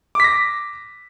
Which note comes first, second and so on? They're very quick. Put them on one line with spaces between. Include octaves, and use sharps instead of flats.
D6 B6 A#6